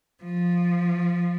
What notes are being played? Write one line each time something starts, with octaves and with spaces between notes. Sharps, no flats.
F3